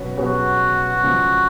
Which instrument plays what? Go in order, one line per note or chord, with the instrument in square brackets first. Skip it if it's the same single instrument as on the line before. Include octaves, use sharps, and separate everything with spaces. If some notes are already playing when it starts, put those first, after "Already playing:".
Already playing: [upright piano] B2 F#3 C#4 B4
[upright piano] B2 F#3 C#4 G#4 B4 [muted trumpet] F#4
[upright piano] C#3 F3 G#3